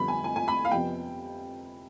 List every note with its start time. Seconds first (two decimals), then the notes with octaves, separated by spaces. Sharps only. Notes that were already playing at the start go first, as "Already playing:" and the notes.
Already playing: F2 D3 G3 B3 B5
0.08 G#5
0.24 G#5
0.36 G#5
0.48 B5
0.65 F5
0.71 F2 C3 F3 B3 G5